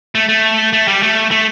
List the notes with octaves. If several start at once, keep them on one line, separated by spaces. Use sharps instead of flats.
A3
A3
A3
G3
A3
A3